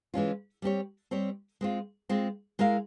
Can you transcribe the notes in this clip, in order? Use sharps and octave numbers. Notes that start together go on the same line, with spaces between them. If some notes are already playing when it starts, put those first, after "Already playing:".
E3 G#3 C#4 F4
G3 C4 G4 C#5
G3 C4 G4 C#5
G#3 C4 F4
G#3 C4 F4
G#3 E4 A#4 F5